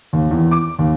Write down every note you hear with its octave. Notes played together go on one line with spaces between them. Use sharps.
D#2
E2
D6
D#2